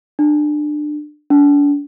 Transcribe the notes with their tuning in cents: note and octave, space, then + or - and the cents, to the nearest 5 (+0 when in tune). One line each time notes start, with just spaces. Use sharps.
D4 +25
D4 -35